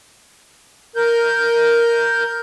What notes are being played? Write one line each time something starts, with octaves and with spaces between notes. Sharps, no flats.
A#4 G6